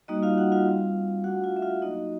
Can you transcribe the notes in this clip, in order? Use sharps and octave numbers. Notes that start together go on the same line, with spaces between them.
G3 A#3 D#4 F#4 D#5
F4 F5
F#4 F#5
F4 F5
G3 C4 F4
A3 D4 F4 F#4 F#5
F4 F5
E5
F4 F5
F#3 A#3 D#4 F#4 D#5